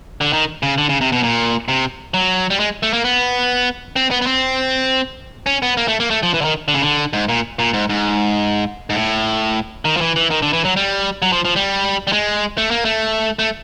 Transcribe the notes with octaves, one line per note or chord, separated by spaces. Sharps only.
D3
D#3
C#3
D3
C#3
C3
B2
A#2
C3
F#3
G3
G#3
A3
A#3
B3
C4
B3
B3
C4
C#4
B3
A#3
A3
A#3
A3
F3
E3
D3
D#3
D3
C#3
D3
G#2
A#2
A#2
G#2
G#2
G#2
A2
D#3
F3
E3
E3
D#3
D3
E3
F#3
G3
F#3
F3
F3
G3
G3
G#3
A3
A#3
A3
A3